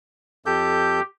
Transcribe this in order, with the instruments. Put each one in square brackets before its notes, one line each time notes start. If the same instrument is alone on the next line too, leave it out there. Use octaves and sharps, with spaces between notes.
[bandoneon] F2 A4 G6 [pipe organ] G4